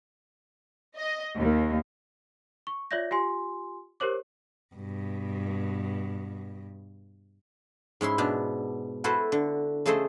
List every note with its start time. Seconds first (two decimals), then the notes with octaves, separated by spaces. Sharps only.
0.98 D#5
1.39 D#2
2.67 C#6
2.91 F4 C#5 D5 E5 G6 A#6
3.11 F4 G4 G#5 C6
4.00 G4 A#4 C5 C#5 D6
4.75 G2 B2
8.01 G#2 C#4 E4 C6
8.18 B2 D4
9.04 E4 F#4 A4 B4 C5
9.32 D3
9.86 C#3 A3 G#4 A4 C5 D#5